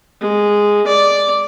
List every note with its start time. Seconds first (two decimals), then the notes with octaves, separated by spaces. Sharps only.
0.21 G#3
0.87 D5